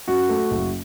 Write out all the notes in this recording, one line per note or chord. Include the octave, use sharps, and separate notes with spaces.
F#2 F#4
A3
F#1